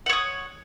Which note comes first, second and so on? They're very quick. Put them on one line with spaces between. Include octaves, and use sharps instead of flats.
F#5 C#5 D#6